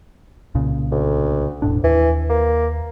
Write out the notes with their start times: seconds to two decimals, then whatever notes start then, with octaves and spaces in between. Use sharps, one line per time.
0.55 C2 A#2 C#3
0.92 D2
1.62 E1 A2 D4
1.84 D#2 E3
2.30 A#3